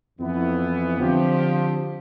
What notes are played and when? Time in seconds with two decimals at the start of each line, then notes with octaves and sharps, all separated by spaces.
0.18 F2 E3 B3 E4
0.98 D3 F3 C4 G4